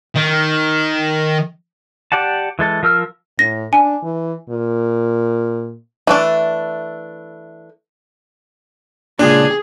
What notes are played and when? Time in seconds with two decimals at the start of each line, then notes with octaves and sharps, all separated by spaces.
0.16 D#3
2.12 G4 D5 F#5 A5
2.59 E3 G#3 A4
2.83 F3 A#4 E6 F6
3.39 A2 A#6
3.73 D4 G#5
4.03 E3
4.49 A#2
6.07 E3 A3 D4
9.19 C#2 A#2 D4 G#4